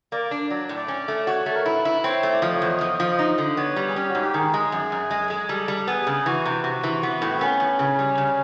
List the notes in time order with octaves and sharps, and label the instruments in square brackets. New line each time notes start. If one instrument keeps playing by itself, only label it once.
[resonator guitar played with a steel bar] A#3 [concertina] D5
[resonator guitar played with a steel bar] D4
[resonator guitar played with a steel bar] F#3 [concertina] D5
[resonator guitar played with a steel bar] A2
[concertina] D5
[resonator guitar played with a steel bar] C#4
A3
[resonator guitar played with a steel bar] F#4 [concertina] C#5
[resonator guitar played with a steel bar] A3
[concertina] A#4
[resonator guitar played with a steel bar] E4 [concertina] B4
[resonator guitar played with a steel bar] E4
[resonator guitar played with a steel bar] C4 [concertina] C#5
[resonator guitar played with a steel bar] A3
[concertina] D5
[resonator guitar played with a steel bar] F3 [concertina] D#5
[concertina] C#5
[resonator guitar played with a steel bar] E2
[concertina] D#5
[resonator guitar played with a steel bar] F3
F3
D#4
D3
[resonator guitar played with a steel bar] B3 [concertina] C#5
[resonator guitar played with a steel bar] G3
[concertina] G#4
[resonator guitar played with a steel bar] C#4 [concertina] G4
[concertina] F#4
[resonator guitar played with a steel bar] G#2
[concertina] G4
[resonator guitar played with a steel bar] D#3 [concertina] G#4
[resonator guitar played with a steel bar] G#3
F#2
F#2
G#3
G#3
[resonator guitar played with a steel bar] G3 [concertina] A4
[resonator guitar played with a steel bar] G3
[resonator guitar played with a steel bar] B3 [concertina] G#4
[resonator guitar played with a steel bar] C#3
[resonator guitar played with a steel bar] E3 [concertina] F#4
[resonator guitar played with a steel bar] C3
[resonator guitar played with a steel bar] C3 [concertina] F#4
[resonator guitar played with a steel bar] E3
B3
A2
[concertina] C4
[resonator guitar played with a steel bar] B3 [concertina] C#4
[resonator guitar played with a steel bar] A2
C#3
G3
C#3